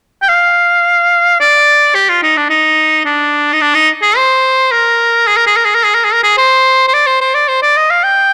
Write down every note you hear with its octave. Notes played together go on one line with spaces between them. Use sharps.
G5
F5
D5
G4
F4
D#4
D4
D#4
D4
D#4
D4
D#4
G#4
C5
A#4
G#4
A#4
G#4
A#4
G#4
A#4
G#4
A#4
G#4
A#4
G#4
C5
C5
D5
C5
C5
D5
C5
D5
D#5
F5
G5